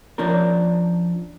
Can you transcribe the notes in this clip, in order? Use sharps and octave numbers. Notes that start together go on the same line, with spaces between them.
F3 C#4 D4 A#4